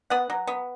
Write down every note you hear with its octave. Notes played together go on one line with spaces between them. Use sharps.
B3 F#5
F#3
B3